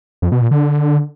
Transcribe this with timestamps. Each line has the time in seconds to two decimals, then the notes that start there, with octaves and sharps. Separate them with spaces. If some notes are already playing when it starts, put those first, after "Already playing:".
0.22 F2
0.32 B2
0.42 A#2
0.51 D3